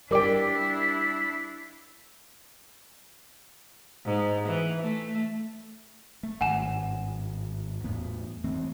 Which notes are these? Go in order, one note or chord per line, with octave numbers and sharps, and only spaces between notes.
G3 D4 E4 A#4 D5 G5 D6
G#2
E3
A3
A3
G#1 G2 F#5 G#5 E7
E2 A2 B3
E3 A3 C4